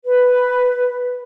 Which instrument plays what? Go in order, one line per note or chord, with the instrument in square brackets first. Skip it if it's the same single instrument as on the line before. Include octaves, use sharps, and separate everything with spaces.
[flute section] B4